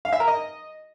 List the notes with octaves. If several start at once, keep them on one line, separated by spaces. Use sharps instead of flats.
F5
E5
A#4
D#5